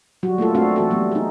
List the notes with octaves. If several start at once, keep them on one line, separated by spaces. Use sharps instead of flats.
F#3 G3 F#4
A3 A#3 F4 A4
A3 C4 D4 F#4 A4 F5
E3 F#4 A4
F#3 G3 A3 B3
D#4 G#4